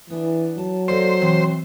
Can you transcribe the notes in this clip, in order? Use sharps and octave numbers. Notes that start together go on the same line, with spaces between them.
E3 B3 D4
F#3 A5
A#3 A4 C5 D5
B2 E3 C4